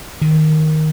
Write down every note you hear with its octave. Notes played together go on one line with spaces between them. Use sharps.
D#3